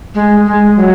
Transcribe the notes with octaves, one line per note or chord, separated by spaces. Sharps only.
G#3
G#3
F#3